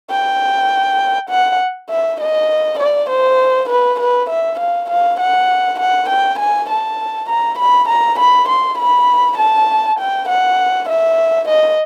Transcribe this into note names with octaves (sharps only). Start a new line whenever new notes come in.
G5
F#5
E5
D#5
D5
C5
B4
B4
E5
F5
F5
F#5
F#5
G5
G#5
A5
A#5
B5
A#5
B5
C6
B5
A5
G5
F#5
E5
D#5